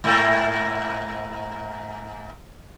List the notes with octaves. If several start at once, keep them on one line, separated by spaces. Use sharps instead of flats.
G#2 A3 A#3